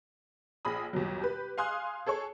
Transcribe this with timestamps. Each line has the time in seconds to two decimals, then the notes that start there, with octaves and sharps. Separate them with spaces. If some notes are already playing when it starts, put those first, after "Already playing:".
0.65 A#1 G#4 B5 D#6
0.93 G1 D#2 B2 F#3
1.21 G4 B4
1.58 F5 G#5 C6 D#6 F#6
2.06 G#4 A4 C#5 C#6